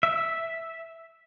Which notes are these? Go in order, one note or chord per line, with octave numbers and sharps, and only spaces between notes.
E5